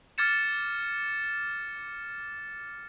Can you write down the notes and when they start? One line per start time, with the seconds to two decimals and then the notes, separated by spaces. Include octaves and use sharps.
0.18 D6 F6 G#6 A6 C#7 E7